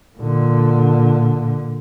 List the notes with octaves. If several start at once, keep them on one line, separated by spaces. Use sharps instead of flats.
A#2 D3